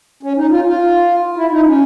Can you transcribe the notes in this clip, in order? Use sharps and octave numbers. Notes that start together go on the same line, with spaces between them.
C#4
D#4
F4
F4
E4
D#4
C#4